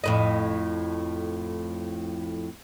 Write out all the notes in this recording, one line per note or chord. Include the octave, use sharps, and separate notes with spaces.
F2 A2 D#5